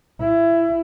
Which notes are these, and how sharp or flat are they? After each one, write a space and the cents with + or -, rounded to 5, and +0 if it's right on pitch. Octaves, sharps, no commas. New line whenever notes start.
E4 +20